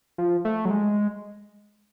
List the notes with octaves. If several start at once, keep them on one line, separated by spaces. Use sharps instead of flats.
F3
A3
F#3
G#3